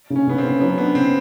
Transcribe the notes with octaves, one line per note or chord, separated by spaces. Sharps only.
C#3
C#4
C#3 B3
C4
C#3
F#3 B3
B3 D4
C#3 C4